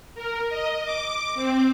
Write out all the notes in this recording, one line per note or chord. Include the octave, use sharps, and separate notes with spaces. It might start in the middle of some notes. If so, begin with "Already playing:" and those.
A#4
D#5
D6
C4